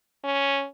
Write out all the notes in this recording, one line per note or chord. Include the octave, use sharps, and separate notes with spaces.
C#4